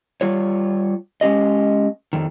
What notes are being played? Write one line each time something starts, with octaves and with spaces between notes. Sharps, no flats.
G3 F4 C#5
G#3 C#4 G4 D#5
F2 D#3